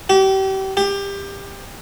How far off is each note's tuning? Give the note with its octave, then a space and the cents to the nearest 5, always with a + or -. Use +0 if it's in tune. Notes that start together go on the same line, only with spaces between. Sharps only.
G4 -35
G4 +20